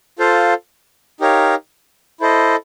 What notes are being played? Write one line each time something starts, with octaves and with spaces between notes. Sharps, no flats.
F4 A4 C5 F5
D#4 G4 A#4 C#5 F5
E4 A4 C5 D#5